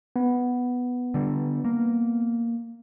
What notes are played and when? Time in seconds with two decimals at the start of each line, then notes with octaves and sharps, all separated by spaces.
0.16 B3
1.14 D3 G3
1.65 A#3